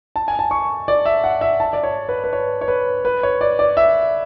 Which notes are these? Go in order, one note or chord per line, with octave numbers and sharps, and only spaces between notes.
A5
G#5
A5
C#6
D5
E5
F#5
E5
A5
D5
C#5
B4
B4
C#5
C#5
B4
B4
C#5
D5
D5
E5